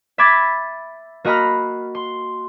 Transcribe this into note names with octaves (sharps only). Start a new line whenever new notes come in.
E5 B5 D6 G#6 A6 B6
A#3 F#4 D#5 A#5 B5 F6
C6